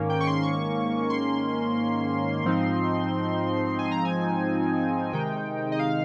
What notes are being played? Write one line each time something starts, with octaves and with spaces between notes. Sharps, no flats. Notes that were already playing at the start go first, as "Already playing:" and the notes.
Already playing: G#2 D#3 A#3 C#4
G5
C#6
C6
C#6
C6
G#2 F3 C4 D#4
G#5
A#5
G#5
C3 D#3 G#3 D#4 G5
D#5
F5